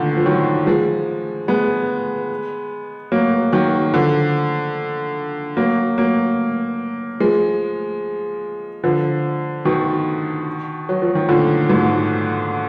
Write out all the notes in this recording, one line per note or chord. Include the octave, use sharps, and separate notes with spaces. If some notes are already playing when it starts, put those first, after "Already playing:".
Already playing: A#2 D3 D#3
F3
D#3 F#3
F3 G#3
G#3 B3
F#3 A#3
D#3 F#3
D3 F3
F#3 A#3
F#3 A#3
F3 G#3
D3 F3
B2 D#3
F#3
F3
D#3
A#2 D3
G#2 B2